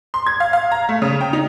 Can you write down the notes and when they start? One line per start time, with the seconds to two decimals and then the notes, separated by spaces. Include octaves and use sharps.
0.14 C6
0.27 G#6
0.40 F5
0.53 F5
0.71 A#5
0.89 A3
1.02 C#3
1.21 G5
1.33 D#4